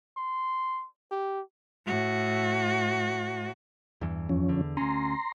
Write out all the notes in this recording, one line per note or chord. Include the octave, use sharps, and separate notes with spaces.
C6
G4
A2 F#4
E2 G2 E3
F2 F3 C#4
E2 D3
D2 C#4 A#5 C6